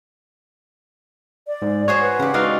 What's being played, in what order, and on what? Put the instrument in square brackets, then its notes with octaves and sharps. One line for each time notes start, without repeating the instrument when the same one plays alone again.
[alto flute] D5
[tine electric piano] G#2
[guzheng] F#4 G#4 C5 [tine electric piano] C#5
[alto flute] B4
[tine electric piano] C#3 [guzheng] G4 F#5
[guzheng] G#3 D#4 D5 [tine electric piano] F#4 F5